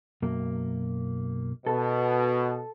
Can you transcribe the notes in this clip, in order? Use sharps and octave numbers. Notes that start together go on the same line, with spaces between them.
B1 F#2 A#3
B2 A4